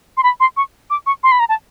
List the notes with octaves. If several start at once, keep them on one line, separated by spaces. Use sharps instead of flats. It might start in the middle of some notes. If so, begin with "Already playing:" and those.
C6
B5
C6
C#6
D6
C#6
C6
B5
A#5
A5